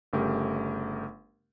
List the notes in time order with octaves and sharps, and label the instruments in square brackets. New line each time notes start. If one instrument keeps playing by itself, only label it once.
[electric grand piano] G1 C#3 A3 G4 A#4